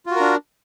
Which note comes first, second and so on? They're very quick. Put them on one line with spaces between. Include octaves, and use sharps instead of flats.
F4 F#4 A#4 D4